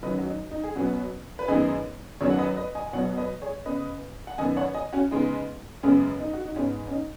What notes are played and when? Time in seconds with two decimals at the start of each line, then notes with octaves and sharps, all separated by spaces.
0.03 F#2 D#3 F#3 B4 D#5
0.19 F#4
0.27 D#4
0.51 D#4
0.64 G#4
0.75 B2 F#3 B3 C#4 F#4
1.39 B4
1.48 F#2 D#3 G#3 B3 D#4 G#4
2.21 F#2 D#3 F#3 B3 G#4 C#5
2.30 F#5
2.39 B4 D#5
2.57 B4 D#5
2.75 D#5 G#5
2.86 G#5
2.93 B2 F#3 B3 C#5 F#5
3.17 B4 D#5
3.42 G#4 C#5
3.65 C#3 B3 B4 D#5
4.27 F#5
4.38 F#2 D#3 B3 D#5 G#5
4.57 C#5 F#5
4.74 D#5 G#5
4.93 C#4 F#4
5.11 C#3 G#3 B3 D#4
5.83 F#2 C#3 G#3 B3 C#4
6.20 D#4
6.33 F#4
6.45 D#4
6.56 G#2 G#3 B3 C#4
6.88 C#4
6.92 D#4